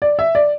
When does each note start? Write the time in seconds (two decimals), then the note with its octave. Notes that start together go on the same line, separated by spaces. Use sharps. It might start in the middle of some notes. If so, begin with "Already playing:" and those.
0.02 D5
0.19 E5
0.35 D5